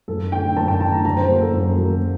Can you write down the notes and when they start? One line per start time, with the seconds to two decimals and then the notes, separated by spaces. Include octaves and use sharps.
0.08 F#2 A4
0.32 D3 A3 G5
0.56 F#2 A5
0.68 G5
0.80 D3 A3 A5
0.92 A#5
1.04 F#2 A#5
1.17 C5
1.29 F#3 A#3
1.41 A4
1.53 F#2
1.78 F#3 A#3